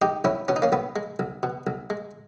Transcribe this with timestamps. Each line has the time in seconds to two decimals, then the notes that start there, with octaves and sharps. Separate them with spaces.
0.02 G#3 D#4 G4
0.24 B1 C#4 E4
0.48 B2 C#4
0.56 D#4
0.62 A#3 C#4
0.72 B1 B3
0.96 G#3
1.19 B1
1.43 B2
1.67 B1
1.90 G#3